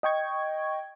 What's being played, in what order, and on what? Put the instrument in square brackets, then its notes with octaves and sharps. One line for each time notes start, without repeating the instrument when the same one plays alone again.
[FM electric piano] D#5 G5 C#6 G#6